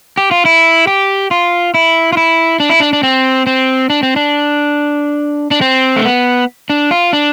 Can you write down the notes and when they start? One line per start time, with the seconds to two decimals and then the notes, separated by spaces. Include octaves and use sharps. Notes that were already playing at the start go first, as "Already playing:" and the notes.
0.17 G4
0.31 F4
0.45 E4
0.87 G4
1.31 F4
1.74 E4
2.13 F4
2.17 E4
2.60 D4
2.70 E4
2.80 D4
2.93 D4
3.03 C4
3.47 C4
3.90 D4
4.03 C4
4.16 D4
5.51 D4
5.61 C4
5.96 A3
6.05 B3
6.70 D4
6.91 F4
7.13 D4